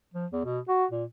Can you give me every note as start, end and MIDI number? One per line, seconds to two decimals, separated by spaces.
0.14 0.26 53
0.32 0.43 40
0.45 0.59 47
0.68 0.86 66
0.91 1.04 46